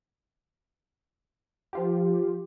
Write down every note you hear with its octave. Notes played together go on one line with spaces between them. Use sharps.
F3 F4 G4